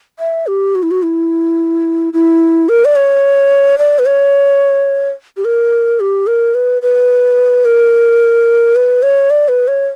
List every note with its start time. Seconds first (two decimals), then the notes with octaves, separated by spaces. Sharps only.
0.19 E5
0.47 G4
0.75 F#4
0.83 E4
0.91 F#4
1.03 E4
2.13 E4
2.69 A#4
2.85 D5
2.96 C#5
3.78 D5
3.99 B4
4.06 C#5
5.37 G4
5.45 A#4
6.00 G4
6.27 A#4
6.55 B4
6.82 B4
7.65 A#4
8.76 B4
9.03 C#5
9.30 D5
9.48 B4
9.68 C#5